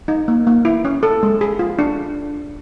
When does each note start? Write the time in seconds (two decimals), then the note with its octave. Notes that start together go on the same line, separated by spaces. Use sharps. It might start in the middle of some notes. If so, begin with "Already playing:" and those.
0.08 D#4
0.28 A#3
0.47 A#3
0.65 E4
0.85 C#4
1.03 A4
1.23 G#3
1.41 G#4
1.59 F4
1.79 D4